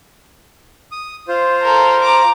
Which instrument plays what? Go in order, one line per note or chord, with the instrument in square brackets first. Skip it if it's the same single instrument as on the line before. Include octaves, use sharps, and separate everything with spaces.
[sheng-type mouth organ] D#6
F4 C5
[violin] A4 A#4
A#5 D6